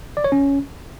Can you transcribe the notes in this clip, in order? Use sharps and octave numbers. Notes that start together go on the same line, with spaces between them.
D5
C#5
C#4